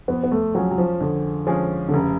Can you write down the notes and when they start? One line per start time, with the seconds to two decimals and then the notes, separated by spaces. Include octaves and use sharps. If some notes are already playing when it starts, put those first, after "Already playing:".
0.08 F2 B3
0.24 B3
0.32 A3
0.55 F3 F#3 G#3 C#4 G#4
0.71 F#3
0.78 F3
1.00 F2 D3
1.47 F3 G#3 C#4 G#4
1.88 D3
1.94 F1 C#3